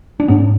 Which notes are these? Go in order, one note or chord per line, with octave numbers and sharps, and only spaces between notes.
D4
G#2 B3 C#4